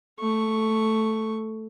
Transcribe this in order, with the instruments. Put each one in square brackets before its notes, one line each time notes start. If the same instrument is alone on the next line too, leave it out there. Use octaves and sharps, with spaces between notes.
[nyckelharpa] A3 C#6